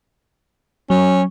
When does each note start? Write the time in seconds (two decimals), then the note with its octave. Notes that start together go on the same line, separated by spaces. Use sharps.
0.90 F#3 C#4